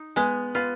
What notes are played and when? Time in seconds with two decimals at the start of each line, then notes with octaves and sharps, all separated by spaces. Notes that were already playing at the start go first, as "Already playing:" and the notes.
Already playing: D#4
0.16 G#3 B3 B4
0.55 B3 F4 B4